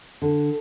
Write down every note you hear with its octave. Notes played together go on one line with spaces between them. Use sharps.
D3